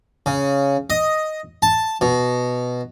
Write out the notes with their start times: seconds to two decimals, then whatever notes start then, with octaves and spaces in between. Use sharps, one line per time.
0.26 C#3
0.90 D#5
1.62 A5
2.01 B2